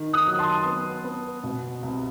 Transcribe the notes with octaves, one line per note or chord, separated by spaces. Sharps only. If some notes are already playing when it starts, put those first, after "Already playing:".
Already playing: D#3
D#6 F#6
F#3
A5 C6
B3
B3
B2
C2